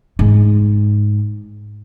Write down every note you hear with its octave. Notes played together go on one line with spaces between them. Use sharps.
G#2 G#3